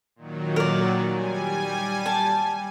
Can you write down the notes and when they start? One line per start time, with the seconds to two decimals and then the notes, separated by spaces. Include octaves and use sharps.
0.16 A#2 D#3 F#3
0.56 A#4 D5
1.09 G3 G#5
2.06 A5